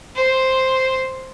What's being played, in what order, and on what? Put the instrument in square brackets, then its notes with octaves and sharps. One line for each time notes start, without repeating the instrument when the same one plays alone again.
[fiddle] C5